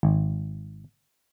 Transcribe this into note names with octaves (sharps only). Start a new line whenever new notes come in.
G#1